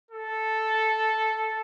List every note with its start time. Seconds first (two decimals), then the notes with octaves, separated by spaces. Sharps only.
0.11 A4